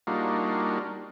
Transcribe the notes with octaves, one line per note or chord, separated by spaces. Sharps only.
G3 A#3 D4 D#4 F4 F#4